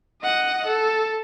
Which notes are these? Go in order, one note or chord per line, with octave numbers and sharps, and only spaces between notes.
D#5 F#5
A4